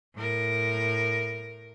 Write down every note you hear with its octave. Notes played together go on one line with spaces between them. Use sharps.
A2 A#4